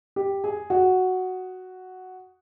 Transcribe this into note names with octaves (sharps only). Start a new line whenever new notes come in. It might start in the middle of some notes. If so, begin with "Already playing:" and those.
G4
G#4
F#4